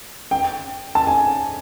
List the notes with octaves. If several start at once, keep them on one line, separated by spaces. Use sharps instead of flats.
G5
A5
G#5